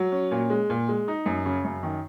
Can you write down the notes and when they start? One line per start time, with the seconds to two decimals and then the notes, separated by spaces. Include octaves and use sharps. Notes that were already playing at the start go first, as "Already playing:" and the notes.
Already playing: F#3
0.12 C#4
0.31 A#2
0.50 G#3
0.70 A#2
0.88 G#3
1.08 D#4
1.26 F#2
1.46 C#3
1.64 F#2
1.83 D#3